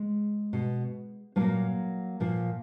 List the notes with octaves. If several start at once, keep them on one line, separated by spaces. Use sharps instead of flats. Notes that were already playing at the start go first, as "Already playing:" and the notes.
Already playing: G#3
B2
A#2 F3 F#3 A#3
A#2 F3